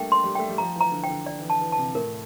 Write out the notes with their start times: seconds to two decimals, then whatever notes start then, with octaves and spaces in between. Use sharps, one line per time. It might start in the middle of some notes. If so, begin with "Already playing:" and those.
Already playing: G3 A3 A#3 D4 G5
0.12 C6
0.24 G3
0.35 A3 G5
0.49 G3
0.58 F3 A#5
0.76 E3
0.81 A#5
0.91 D3
1.04 G5
1.10 D3
1.26 D5
1.39 E3
1.44 D3
1.50 A5
1.61 E3
1.72 A5
1.78 C3
1.95 A2 A#4